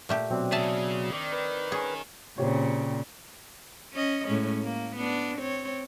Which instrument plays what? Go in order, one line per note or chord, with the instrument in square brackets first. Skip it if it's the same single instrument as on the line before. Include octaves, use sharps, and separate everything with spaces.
[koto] A#2 A3 G4
[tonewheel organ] B2 F#3 [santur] C4 D4
[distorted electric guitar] C#3 G#4 [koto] E5 A5 [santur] E6
[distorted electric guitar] D#3 [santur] D5
[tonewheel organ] B4
[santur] C#4 [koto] G#4
[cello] A#2 C#3 [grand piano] C4 G4 C#5
[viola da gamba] C#4 D#5
A2 G#3 C#4
A3 A#3
B3 D4
C4 C#5